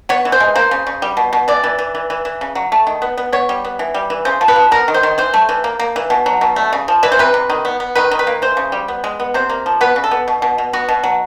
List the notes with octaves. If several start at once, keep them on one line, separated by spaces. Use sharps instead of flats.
B3 C#5
E3
C5
G#3
A#3 C5
C#3
C#3
G3
B2
B2
E3 D5
E3
E3
E3
E3
E3
C#3
F#3
A3
D#3
B3
B3
B3 C#5
G3
B3
E3
G3
E3
C#3 C5
F3
B4
F3
B3 A#4
D#3
C5
D#3
E3 C5
A3
E3
A#3
A#3
E3
B2
F#3
B2
A3
C#3
F3
E3 B4
C5
C3 B4
C3
D#3
B3
B3
D#3 B4
D#3
B4
A#3
E3 C5
C#3
G3
B3
G#3
B3
C3 C5
A#3
F3
B3 B4
C#3
A4
B3
B2
B2
B2
B3 F#4
B2
F#3